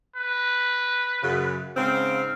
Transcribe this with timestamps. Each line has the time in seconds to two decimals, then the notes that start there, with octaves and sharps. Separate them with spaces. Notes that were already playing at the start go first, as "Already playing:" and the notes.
0.16 B4
1.23 F#2 C#3
1.77 G#2 C#3 C4 F5